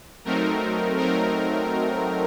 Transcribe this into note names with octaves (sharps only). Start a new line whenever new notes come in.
F#3 A3 C4 D#4 A#4
F#3 A3 C4 D#4 A#4